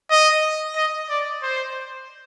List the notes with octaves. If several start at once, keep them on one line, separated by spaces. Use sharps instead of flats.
D#5
D#5
D5
C5